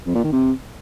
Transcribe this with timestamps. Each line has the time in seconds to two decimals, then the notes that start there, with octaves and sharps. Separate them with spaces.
0.06 F2
0.15 A#2
0.24 D#3
0.32 C3